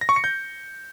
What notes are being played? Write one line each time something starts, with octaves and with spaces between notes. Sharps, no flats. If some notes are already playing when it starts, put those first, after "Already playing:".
A#6
C#6
C#7
G6